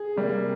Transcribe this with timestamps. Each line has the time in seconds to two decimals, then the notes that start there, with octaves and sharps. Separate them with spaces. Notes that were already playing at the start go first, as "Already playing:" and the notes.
Already playing: G#4
0.16 C3 G3 A#3